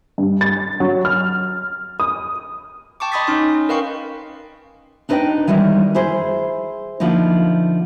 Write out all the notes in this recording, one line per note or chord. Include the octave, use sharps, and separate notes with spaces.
G2
A6
F#3
F6
D#6
G5 A5 C#6 D6
D#5 B5 C6 D#6 A6 B6
C#4 D#4 C6
C#4
A#4 B4 D#5 F5 G5 C#6
D4 D#4 B4 C5 D#5 G5
D#3 E3 G3 G#3 E4 A#4
E4 G#4 C5
D3 F3 A#3 D#4 E4